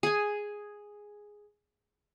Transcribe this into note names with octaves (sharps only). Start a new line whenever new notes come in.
G#4 G#5